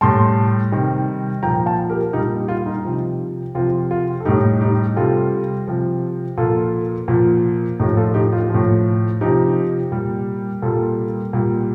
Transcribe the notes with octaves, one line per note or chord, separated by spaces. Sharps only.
A2 G3 A5 C6
C3 D#3 G3
A#2 F3 G5 A#5
F5 A5
G4 A#4
A#2 G3 D#4 G4
F4
D#4
C3 F3
C3 F3 F4
F4
A4
A2 G3 D#4 G4
D#4 G4
C3 G3 F4 A4
C3 F3
A#2 F3 F4 A4
A#2 F3
A2 F3 D#4 G4
F4 A4
D#4 G4
F4
A2 F3
C3 F3 D#4 G4
A#2 G3
A#2 G3 F4 A4
A#2 G3